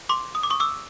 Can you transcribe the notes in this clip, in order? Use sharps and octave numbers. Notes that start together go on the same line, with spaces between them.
C6 D6
D#6
D6
C#6 D#6
D6 E6